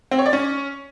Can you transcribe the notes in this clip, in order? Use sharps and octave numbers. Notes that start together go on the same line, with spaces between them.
C4
C#5
D5
C#4